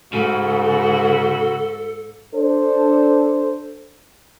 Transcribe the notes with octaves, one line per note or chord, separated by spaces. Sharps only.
G#2 C#3 F#4 A4
D4 A4 C5